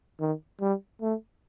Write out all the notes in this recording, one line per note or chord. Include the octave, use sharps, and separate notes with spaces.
D#3
G3
A3